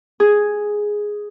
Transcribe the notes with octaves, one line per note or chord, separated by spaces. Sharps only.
G#4